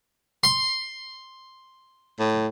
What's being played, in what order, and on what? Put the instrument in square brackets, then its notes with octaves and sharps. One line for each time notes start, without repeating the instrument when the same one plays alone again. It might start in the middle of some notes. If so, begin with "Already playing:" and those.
[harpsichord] C6
[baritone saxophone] A2